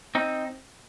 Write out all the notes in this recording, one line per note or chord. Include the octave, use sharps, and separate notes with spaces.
C4 D#4